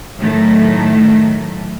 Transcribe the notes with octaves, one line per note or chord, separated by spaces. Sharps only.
A2 D#3 F#3 A3